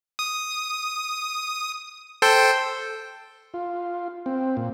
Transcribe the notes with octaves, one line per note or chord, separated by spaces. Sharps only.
D#6
A4 C5 G5
F4
C4
A#2